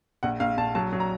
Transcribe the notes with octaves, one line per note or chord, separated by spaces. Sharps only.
A#1 F#5
A#1 F5
A#1 A5
F#3 A5
F#3
A#5